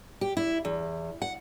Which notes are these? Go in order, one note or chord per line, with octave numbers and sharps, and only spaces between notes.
G4
E4
E2
F#5